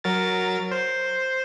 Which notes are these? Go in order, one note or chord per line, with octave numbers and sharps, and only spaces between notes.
F#3 A#4 A6
C5